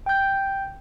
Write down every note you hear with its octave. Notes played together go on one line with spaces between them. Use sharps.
G5 G6